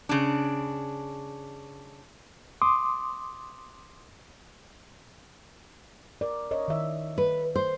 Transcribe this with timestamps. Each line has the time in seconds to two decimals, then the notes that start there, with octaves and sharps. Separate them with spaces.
0.09 C#3 D4
2.62 C6 D6 D#6
6.21 A#4 D5
6.51 A#4 C#5 D#5
6.68 D#3 E5
7.18 B4
7.56 C5